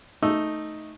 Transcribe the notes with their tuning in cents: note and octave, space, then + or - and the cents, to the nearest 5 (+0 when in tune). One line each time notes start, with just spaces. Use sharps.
A3 +0 D#4 +0 E6 +0